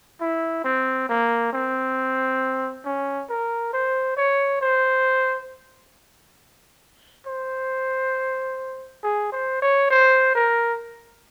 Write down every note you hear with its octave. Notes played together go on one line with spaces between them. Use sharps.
E4
C4
A#3
C4
C#4
A#4
C5
C#5
C5
C5
G#4
C5
C#5
C5
A#4